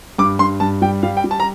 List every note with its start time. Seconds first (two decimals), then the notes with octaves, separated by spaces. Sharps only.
0.18 G2 D6
0.39 G2 C6
0.60 G2 A5
0.82 G3 G5
1.03 G3 F5
1.17 G5
1.24 G3
1.31 A5
1.40 A#5